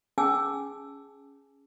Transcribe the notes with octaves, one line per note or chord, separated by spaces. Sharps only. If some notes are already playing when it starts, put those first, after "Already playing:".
C#4 G#4 G#5 A5 D6 E6